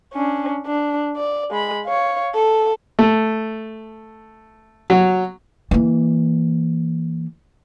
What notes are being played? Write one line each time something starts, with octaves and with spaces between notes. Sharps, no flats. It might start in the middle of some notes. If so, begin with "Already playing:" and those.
C#4 D4
D4
D5
G#3 B5
C#5 F5
A4
A3
F#3
E3 A#3